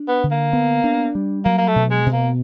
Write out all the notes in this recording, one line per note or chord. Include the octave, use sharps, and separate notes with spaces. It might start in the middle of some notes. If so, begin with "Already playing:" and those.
Already playing: D4
B3
D3
A#3
B3
D4
G3
F#3 A#3
A#3
A3
B2
G#3
B2
A#3